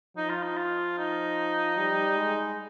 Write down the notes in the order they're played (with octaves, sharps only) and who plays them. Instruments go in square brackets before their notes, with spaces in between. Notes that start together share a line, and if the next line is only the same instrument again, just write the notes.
[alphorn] F3 [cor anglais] D#4
[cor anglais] F4
D#4
F4
D#4
[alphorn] G3
G#3